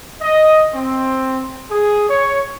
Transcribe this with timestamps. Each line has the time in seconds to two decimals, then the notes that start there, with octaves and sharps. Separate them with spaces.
0.21 D#5
0.74 C4
1.70 G#4
2.09 C#5